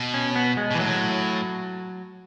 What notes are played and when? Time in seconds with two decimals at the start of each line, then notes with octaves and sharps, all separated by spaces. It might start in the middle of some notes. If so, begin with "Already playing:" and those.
Already playing: B2
0.14 C#4
0.36 B3
0.57 G#3
0.71 B2
0.75 E3
0.79 A2 F#3